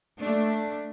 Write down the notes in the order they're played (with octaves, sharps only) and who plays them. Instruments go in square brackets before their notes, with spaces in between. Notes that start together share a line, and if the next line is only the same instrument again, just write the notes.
[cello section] A3 D4